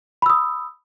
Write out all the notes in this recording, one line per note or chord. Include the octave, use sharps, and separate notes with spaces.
B5 D#6 E6